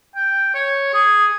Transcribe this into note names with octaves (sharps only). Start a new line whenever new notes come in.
G5
C#5
G#4